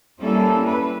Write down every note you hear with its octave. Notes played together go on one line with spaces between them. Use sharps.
G3 A#3 C#4 E4 A4
B4